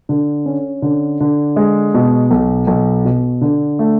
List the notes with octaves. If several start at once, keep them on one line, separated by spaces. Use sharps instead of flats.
D3
C#4
D3
D3
G#3
B2
B1
B1
B2
D3
A3